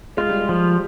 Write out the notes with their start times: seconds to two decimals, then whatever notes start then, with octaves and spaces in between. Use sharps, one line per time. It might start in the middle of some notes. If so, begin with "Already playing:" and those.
0.17 G#3 F4
0.29 G3
0.40 G#3
0.49 F3